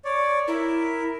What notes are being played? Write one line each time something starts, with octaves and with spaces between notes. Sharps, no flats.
C#5 D5
E4 A#4